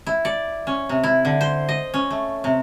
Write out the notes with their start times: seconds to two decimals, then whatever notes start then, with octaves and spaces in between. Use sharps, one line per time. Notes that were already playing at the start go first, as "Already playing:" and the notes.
0.06 E4
0.25 D5
0.67 C#4
0.89 C3
1.03 E4
1.25 D3
1.41 C5
1.68 D#5
1.94 C#4
2.10 A3
2.44 C3